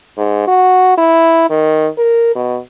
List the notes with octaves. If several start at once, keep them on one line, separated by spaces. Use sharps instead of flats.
G#2
F#4
E4
D#3
A#4
B2